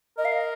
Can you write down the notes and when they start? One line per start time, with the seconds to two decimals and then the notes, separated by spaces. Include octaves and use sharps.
0.17 A#4 D#5
0.25 F5
0.32 D#5